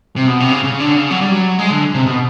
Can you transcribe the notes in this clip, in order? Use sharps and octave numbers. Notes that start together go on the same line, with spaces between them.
C3
B2
C3
C#3
C#3
D3
C#3
F#3
G3
F#3
G#3
D3
C3
B2